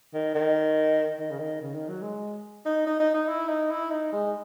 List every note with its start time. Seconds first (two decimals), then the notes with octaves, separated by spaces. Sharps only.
0.14 D#3
0.35 D#3
1.19 D#3
1.31 C#3
1.39 D#3
1.61 C#3
1.74 D#3
1.89 F#3
2.02 G#3
2.66 D#4
2.87 D#4
3.00 D#4
3.14 D#4
3.28 E4
3.49 D#4
3.71 E4
3.91 D#4
4.13 G#3